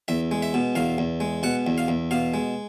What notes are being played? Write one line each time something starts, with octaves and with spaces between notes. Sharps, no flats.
E2 E5
G#3
E5
B2
E2 F5
E2
G#3
B2 F#5
E2
F5
E2
B2 F5
G#3